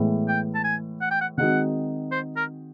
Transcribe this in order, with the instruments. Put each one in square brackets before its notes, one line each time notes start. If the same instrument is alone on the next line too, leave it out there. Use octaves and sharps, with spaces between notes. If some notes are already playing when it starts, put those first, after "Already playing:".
Already playing: [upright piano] A2 E3 G#3 B3 E4
[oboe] G5
A5
G#5
F#5
G5
F#5
[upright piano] D#3 G#3 C4 D#4 F#4 [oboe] F#5
[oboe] C5
A#4